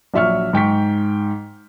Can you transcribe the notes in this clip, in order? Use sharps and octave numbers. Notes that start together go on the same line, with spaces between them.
A#1 F#3 E5 C#6 F6
G#2 G5 C#6 B6